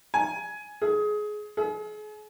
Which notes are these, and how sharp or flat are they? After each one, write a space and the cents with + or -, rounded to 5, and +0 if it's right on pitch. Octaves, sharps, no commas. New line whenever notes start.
G#5 +15
G#4 +20
G#4 +40